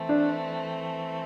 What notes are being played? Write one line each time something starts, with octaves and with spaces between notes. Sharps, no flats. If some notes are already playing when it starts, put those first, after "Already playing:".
Already playing: E3 A3 C4
D4